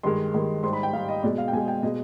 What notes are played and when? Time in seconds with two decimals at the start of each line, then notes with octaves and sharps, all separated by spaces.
0.03 G2 D#3 G#3 C6
0.34 G2 D#3 G#3
0.63 G#2 G3 C6
0.73 B5
0.83 G5
0.93 G#2 F5
0.96 G3
1.08 D#5
1.23 B2 G#3 D5
1.38 F5
1.48 G5
1.53 B2 G#5
1.56 G#3
1.68 G5
1.83 B2 G#3 D#5